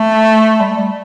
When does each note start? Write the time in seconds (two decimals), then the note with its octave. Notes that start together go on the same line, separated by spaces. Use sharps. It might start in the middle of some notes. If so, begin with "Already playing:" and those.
Already playing: A3
0.60 G3
0.77 G3